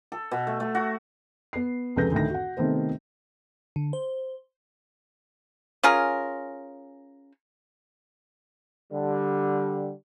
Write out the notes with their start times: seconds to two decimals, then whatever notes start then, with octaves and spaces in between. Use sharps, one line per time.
0.12 A4
0.31 B2
0.47 A3
0.60 A3
0.75 F#4
1.53 B3 C7
1.96 F1 C#2 A4 B4 G6 A#6
2.12 D2 A2 D#3 A#6
2.30 F#4 F#5
2.57 C3 D#3 A3 B3 C5
3.76 D3
3.93 C5
5.83 C#4 F4 G#4 A#4
8.92 D3 G3